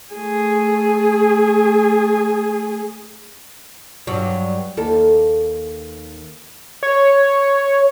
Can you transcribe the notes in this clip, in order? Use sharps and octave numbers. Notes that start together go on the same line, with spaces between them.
A3 G#4
G2 F#3
D#2 A4
C#5